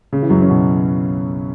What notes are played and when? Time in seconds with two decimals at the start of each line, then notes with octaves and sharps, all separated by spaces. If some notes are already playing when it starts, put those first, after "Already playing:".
0.13 C#3
0.22 E3
0.30 F#2 F#3
0.42 C#4
0.50 B2 B3